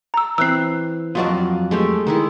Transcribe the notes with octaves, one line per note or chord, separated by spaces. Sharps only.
A#5 E6
E3 C4 E6 F#6 C7
F2 F#3 F4 F#4 D5 D#5
G#3 A3 G4
D#3 G#3 E4